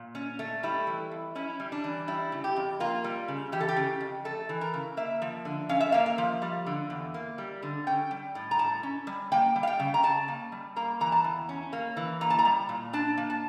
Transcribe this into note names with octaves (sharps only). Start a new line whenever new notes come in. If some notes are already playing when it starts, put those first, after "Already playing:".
Already playing: A#2
C#4
A3
G3 E4
E3
F2
C#4 E4
G3
D4
E3
G3 E4
C#3
G4
F2
A#3 F4
G3
C#3
E3 G4
A4
G4
C#3
F2
A3 A4
E3
A#4
C#3
A#3 E5
F3
D3
C#4 F5
E5
A#3 F5
F5
F3
G3
D3
E2
A#3
G3
D3
C#4 G5
G3
A2
A#5
A2 A5
C#4
G3
A#3 G5
G3
F5
G5
C#3
A#5
C#3 A5
A#3
G3
A#3 A#5
E3 A#5
A5
E2
C#4
A#3
E3
A#3 A#5
A5
A#5
G3
A#2
D4 A5
A#3
A5